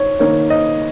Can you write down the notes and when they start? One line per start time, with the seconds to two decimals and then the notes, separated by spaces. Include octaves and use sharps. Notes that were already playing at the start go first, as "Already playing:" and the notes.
Already playing: D#3 C#5
0.19 D#3 A#3 D#4 C#5
0.50 D#5